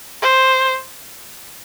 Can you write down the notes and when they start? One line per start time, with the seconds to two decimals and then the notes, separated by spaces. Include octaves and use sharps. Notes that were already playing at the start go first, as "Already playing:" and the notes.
0.22 C5